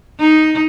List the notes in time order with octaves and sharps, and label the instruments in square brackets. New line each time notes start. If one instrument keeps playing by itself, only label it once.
[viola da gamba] D#4